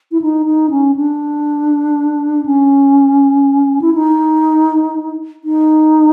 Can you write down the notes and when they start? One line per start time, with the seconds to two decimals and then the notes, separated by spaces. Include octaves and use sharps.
0.12 E4
0.22 D#4
0.46 D#4
0.70 C#4
0.96 D4
2.45 C#4
3.81 E4
3.95 D#4
5.44 D#4